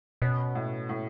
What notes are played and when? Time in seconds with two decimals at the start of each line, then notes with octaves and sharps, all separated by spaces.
0.22 B2 C#4
0.55 A2
0.89 A2